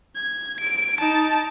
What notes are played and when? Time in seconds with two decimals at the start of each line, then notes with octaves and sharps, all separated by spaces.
0.16 G#6
0.60 D7
1.00 D#4 A5